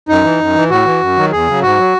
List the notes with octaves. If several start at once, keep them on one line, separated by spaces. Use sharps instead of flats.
F#2 D#4
E3
F#2
E3
A2 F#4
E3
F#2
D#3 F#3
E2 G#4
C#3 F#3
G#2 F#4
F#3